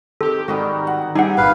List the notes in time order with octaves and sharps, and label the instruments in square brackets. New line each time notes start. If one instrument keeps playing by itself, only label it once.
[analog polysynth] D#3 G4 [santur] C4 [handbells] A4
[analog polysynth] G#2 D#3 [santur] G3 D#4 F#4
[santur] F#5
[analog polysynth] G3 C4 G#4 [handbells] D#4 F#5 [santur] G4
[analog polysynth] G#1 A#2 [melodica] B4 F5